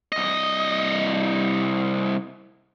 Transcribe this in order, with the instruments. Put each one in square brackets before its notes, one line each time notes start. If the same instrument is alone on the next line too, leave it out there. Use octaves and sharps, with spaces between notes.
[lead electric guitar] C2 D#5